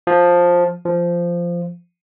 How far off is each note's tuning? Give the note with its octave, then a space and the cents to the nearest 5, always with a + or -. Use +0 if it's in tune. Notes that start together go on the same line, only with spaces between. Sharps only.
F3 +10
F3 -10